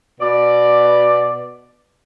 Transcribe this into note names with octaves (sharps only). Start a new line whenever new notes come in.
B2 D5